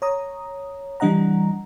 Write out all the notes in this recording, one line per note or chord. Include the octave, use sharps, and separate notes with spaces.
C#5 A#5 D#6
E3 G3 D4 D#5 F#5 A#5